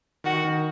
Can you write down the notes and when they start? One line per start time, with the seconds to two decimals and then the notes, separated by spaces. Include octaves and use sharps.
0.24 D#3 F#4
0.45 D#3